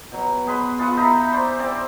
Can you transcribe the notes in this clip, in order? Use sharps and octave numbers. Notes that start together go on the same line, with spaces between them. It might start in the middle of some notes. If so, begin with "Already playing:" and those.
B2 F#3
B2 G#4 B4 C6
F4 G#4 E5 F#5
D#4 E4 A#5 B5
C5 D5
C4 D5